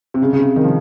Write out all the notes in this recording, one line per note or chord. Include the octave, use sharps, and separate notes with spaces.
C3
C#3
C#3
C3
D#3
F3